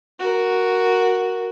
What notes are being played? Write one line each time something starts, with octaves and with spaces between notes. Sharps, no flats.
F#4 A#4